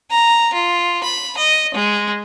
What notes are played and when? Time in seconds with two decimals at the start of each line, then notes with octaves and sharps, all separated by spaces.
0.11 A#5
0.53 F4
1.04 B5
1.37 D#5
1.74 G#3